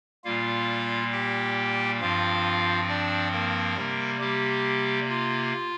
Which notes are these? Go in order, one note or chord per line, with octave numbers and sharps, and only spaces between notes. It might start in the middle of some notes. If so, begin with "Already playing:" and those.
A#2 G3 A#3 F4 F5
G4 G5
G2 F3 C4 F4 F5
D4 D5
A#3 A#4
C3 G3 A#3
G3 G4
F4